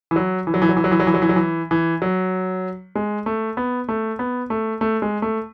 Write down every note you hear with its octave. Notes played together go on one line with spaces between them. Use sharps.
E3
F#3
E3
F#3
E3
F#3
E3
F#3
E3
F#3
E3
F#3
E3
F#3
E3
E3
F#3
G#3
A3
B3
A3
B3
A3
A3
G#3
A3